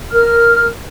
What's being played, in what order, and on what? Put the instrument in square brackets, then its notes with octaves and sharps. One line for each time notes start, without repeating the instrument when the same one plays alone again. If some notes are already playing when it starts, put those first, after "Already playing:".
[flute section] A#4 F6